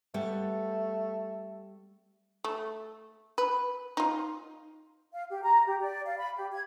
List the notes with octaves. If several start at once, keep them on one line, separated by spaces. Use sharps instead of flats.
G3 A3 B3
A3
B4
D#4 F4
F5
G4
A#5
G4
D5
F5
B5
G4
G#6